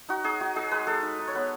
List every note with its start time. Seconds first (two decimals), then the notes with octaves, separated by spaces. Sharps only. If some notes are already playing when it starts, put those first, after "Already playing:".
0.09 D#4 F#4
0.24 D#4 G#4
0.41 D#4 F#4
0.56 D#4 G#4
0.71 G#3 B4
0.87 G#3 A4
1.03 D#4
1.19 D#4
1.27 C#5
1.35 B3 B4